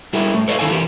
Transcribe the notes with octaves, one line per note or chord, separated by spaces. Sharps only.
G3 E4 G#4 A#4
A2 A3
A4 B4 C#5 D#5 F5
D#3 E4 A4 F5 G#5
E3 G4 A#4